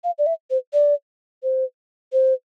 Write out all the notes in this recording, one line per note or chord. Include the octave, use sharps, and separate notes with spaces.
F5
D5
E5
C5
D5
C5
C5